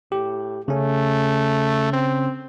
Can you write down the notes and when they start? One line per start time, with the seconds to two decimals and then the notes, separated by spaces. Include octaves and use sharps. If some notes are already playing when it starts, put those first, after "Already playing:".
0.12 A2 G4
0.68 C#3 A3 C#4
1.93 C4